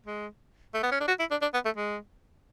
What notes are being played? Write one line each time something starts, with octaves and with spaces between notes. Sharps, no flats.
G#3
A3
B3
C#4
D4
F#4
E4
D4
D4
B3
A3
G#3